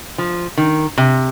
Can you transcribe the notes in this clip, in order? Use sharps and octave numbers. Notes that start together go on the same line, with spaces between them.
F3
D#3
C3